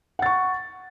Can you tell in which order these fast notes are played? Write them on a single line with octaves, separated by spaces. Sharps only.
F#5 A6 C#6